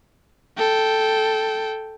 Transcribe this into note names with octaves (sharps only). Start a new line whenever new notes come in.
A4 G5